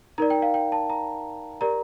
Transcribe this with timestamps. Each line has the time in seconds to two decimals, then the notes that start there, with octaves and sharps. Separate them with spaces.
0.18 D#4 A#4 D5 A#5
0.30 G5
0.42 F5
0.54 G5
0.72 A5
0.90 A#5
1.61 G4 A#4 D5 A#5